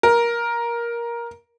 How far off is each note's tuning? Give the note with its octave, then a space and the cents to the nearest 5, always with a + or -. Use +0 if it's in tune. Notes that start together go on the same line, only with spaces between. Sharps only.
A#4 +15